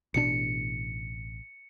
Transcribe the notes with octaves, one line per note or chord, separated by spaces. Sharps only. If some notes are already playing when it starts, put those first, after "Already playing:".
A1 B2 D4 C#7